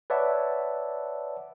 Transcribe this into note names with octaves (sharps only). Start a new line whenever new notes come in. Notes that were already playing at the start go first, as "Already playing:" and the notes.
B4 C#5 D5 E5 F#5 A5